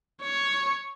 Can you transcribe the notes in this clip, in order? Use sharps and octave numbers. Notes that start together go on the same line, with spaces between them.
C#5